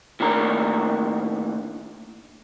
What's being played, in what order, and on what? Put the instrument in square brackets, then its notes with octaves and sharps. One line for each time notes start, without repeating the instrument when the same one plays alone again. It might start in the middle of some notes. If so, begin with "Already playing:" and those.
[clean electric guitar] A2 D#3 A#3 D4 A#5